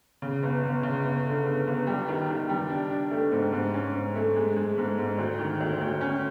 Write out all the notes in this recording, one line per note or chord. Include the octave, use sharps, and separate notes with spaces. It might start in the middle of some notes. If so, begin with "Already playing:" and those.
C#3
G1
G1
C#3
G1
D3
G1
G1
G3
D#3
D#3
G3
D4
D4
A3
G#2
G#2
C#4
G#2
A3
G#3
G#3
G#2
G#2
D2
D#3
D2
D2
C#4